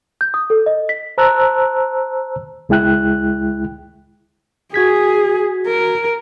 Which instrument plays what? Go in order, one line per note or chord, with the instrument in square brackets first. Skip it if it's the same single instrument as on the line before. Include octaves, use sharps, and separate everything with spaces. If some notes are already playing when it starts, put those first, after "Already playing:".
[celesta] G6
D#6
A4
D#5
B6
[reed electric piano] C5 A5 A#5 E6 F#6
C#2 G#3 E4 G5 F#6
[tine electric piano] F#4 G#6 B6 [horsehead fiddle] G#4
[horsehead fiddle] A#4